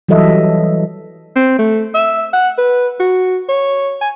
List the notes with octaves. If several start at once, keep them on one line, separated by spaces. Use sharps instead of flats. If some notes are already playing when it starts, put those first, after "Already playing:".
E3 F#3 G3 A4 D#5 E5
C4
A3
E5
F#5
B4
F#4
C#5
G#5